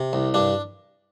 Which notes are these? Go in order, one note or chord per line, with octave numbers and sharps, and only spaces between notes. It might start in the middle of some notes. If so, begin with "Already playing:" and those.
Already playing: C3
C2
G2 D4